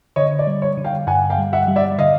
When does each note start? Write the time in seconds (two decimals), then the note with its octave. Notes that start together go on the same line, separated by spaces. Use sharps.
0.16 D3 C#5 D#5
0.39 D5
0.47 G3
0.62 C#5
0.78 D3
0.84 F5 G5
1.07 G2 F#5 G#5
1.30 F5 G5
1.38 G3
1.53 E5 F#5
1.68 G3
1.76 D5 E5
1.98 D3 D#5 F5